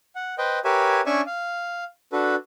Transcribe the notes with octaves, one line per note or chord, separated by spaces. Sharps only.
F#5
B4 C5 D#5 G5
G4 A#4 B4 C#5 E5 G#5
C#4 D4 D5 E5 G#5 C#6
F5
D4 F#4 A4 B4